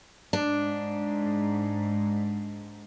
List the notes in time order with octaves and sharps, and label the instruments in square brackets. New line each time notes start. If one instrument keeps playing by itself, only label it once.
[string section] G#2 [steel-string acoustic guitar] D4